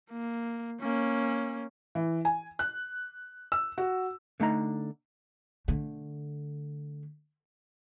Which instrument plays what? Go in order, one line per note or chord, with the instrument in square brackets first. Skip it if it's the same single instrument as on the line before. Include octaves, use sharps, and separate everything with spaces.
[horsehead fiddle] A#3
A#3 C#4
[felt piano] E3
G#5
F#6
E6
F#4
[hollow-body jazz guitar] D3 A3 D#4 A#5
[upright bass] D3 A3